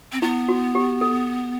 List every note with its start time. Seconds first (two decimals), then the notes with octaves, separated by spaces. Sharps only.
0.12 C4
0.22 B3 E4
0.49 F#4
0.75 G4
1.01 A4